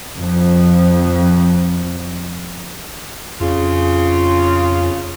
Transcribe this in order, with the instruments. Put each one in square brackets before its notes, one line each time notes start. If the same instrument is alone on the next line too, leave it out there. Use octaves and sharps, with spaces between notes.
[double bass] F2 F3
[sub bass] F2 [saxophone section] C#3 F4